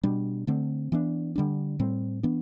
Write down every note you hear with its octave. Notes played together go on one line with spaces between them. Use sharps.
B2 G3 D4
D3 A3 C4
E3 B3 D4
D3 G3 D4
A2 G3 C4
E3 B3 D4